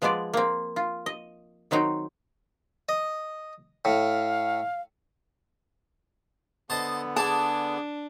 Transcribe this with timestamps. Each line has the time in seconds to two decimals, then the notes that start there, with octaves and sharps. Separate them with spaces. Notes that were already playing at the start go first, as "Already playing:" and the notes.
0.02 F3 G#3 B3 G#4 D5
0.34 A#3 C4
0.76 F4
1.06 D#5
1.71 D#3 F#3 C4 D#4
2.89 D#5
3.85 A2 F5
6.70 D3 B3 C5 D#5 A5
7.16 D4 G#4 D5 A5